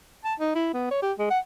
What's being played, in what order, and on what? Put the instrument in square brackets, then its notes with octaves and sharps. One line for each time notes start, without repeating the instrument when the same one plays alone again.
[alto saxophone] A5
D#4
E4
B3
C#5
G4
G#3
F#5